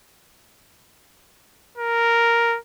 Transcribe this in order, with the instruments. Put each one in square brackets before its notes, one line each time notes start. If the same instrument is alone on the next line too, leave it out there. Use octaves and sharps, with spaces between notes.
[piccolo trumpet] A#4